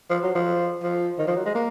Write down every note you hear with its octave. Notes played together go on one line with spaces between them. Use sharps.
F3
F#3
F3
F3
D#3
F3
F#3
G#3
A#3